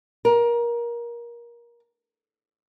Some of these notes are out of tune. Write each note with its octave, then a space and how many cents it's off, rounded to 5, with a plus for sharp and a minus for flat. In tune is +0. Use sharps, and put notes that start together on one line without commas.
A#4 +20